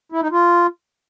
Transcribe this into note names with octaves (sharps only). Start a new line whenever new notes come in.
E4
D#4
F4